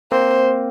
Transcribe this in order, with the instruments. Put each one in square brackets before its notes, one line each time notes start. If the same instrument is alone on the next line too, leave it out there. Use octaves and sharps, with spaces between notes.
[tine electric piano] A#3 C4 [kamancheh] C5